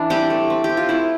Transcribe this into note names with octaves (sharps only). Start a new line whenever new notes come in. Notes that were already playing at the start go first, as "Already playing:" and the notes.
Already playing: E3 D4
G3 C4 G4
A3
C4
G4
C4
F4
A3 E4